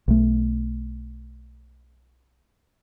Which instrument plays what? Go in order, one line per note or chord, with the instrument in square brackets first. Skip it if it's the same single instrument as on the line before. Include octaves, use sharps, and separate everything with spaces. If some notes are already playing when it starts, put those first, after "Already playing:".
[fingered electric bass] B1 A3